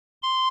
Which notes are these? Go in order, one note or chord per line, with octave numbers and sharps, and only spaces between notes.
C6